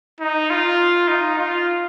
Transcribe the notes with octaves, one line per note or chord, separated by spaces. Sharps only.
D#4
F4
D#4
F4